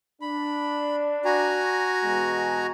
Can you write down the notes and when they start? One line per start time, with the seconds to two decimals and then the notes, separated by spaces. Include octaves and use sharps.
0.22 D4 B5
1.25 F#4 G#5 A#5
2.04 E2 B2 G#3